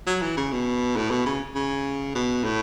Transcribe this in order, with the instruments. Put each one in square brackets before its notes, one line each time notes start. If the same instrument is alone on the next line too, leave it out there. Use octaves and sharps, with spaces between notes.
[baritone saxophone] F#3
E3
C#3
B2
A2
B2
C#3
C#3
B2
A2